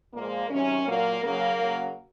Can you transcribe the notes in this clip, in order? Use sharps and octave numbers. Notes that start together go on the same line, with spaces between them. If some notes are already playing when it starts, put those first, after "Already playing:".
A#2 F3 G#3 A#3
C3 D#3 F#3 C#4
A#2 F#3 A#3
C#3 F#3 A#3
C#3 F#3